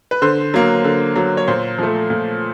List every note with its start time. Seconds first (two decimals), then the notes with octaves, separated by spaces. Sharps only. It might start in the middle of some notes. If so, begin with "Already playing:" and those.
0.11 B4
0.22 D3 C5
0.54 F#3 A#3
0.84 D3
1.16 F#3 A#3
1.37 C#5
1.48 A#2 C5
1.79 F3 A3
2.10 A#2